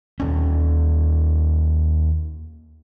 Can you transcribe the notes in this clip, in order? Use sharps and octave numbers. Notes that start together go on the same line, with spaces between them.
D#2 C#4